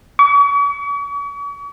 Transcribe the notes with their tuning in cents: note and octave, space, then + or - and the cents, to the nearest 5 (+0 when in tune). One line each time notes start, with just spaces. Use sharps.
C#6 +45